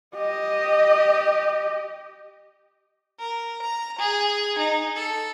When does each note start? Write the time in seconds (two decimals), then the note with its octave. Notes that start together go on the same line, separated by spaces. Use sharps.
0.16 G4 D#5
3.20 A#4
3.62 A#5
3.99 G#4
4.58 D#4
4.96 A4